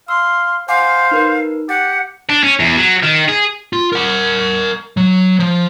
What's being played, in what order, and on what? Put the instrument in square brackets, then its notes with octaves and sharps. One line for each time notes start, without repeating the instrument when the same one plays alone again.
[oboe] F5 [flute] C6 [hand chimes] E6
[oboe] C5 [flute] F5 [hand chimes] F#5 G#5 D6
[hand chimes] D#4 A#4 B4
[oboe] G4 [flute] F#5 [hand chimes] A6
[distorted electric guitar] D4
C#4
E2
F#3
D#3
G#4
[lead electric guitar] F4
A#4 F#5
F#3
F3